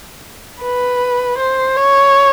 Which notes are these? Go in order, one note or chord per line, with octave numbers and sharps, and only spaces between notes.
B4
C5
C#5